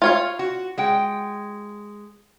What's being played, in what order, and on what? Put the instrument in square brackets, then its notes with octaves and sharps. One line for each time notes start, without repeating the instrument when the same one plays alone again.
[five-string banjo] F4 C#5 F5
[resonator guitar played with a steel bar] F#4
G#3 F#5 G5